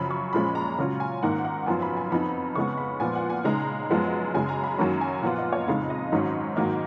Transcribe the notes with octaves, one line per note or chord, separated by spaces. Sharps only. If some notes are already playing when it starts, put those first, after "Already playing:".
Already playing: F#2 C#3 F3 B5
C#6
A#2 F3 G#3 C#4 B5
A#5
C#3 F#3 C#4 F4 A#5
G#5
G#2 D#3 A#3 D#4 F#5
F#5
F#2 F3 B3 F4 G#5
B5
G#5
F2 F3 B3 D#4 B5
C#3 G#3 B3 C#6
B5
A#2 F3 B3 F4 G#5
F#5
G#5
C#3 G#3 D#4 A#5
F#2 F3 G#3 B3
F#2 C#3 G#3 G#5
A#5
B5
F#2 D#3 F#3 A#3 C#4 A#5
G#5
A#2 F3 B3 F4 F#5
D#5
C#5
F2 C#3 G#3 D#4 F5
D#5
G#2 D#3 F#3 C#4
G#2 D#3 F#3 A#3 D#5